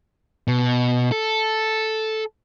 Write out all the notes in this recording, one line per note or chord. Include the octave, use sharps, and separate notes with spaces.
B2
A4